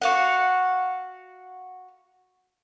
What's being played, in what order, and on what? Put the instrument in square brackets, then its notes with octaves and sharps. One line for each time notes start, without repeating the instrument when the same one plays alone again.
[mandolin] F#4 F5 F#5